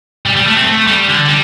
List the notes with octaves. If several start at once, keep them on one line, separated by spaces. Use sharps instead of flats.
G3
G3
A3
C4
A3
G3
D3
G3